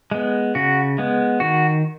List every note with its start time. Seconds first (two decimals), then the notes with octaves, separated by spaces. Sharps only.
0.11 G#3 B3
0.55 C#3 F#4
0.98 G#3 B3
1.40 D#3 F#4